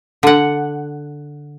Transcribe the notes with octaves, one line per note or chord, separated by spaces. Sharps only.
D3 F#5